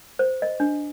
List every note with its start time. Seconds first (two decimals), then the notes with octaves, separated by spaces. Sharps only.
0.19 C5
0.42 D#5
0.60 D4